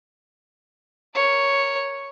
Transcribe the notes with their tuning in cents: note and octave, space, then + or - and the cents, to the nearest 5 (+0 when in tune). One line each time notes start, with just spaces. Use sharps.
A#4 +0 C#5 +0